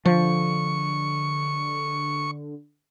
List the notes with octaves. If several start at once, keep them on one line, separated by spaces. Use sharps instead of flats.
D3 F3 C#6